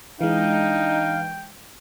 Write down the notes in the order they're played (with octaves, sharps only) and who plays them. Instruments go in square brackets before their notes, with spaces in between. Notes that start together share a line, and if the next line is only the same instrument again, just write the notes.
[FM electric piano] E3 G#3 [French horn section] D4 D#4 [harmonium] F5 [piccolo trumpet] G5